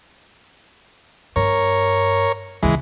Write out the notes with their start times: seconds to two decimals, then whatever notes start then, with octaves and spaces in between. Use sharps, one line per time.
1.36 G2 A#4 C#5
2.63 D2 C#3 E3 G#3